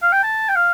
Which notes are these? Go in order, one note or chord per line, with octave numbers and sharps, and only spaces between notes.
F5
G5
A5
G5
F5